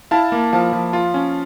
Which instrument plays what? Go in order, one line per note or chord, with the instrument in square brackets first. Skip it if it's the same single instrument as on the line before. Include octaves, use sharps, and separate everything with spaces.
[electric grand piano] E4 F5 A5
A#3
F3 F5 A5
F3
F4
C#4